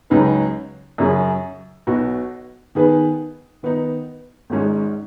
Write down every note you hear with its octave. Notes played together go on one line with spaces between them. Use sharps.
C#2 C#3 F#3 D#4 B4
F#2 C#3 F#3 C#4 G#4
B1 B2 B3 F#4
D#3 B3 G#4 B4
D#3 B3 D#4
G#1 G#2 G#3 C#4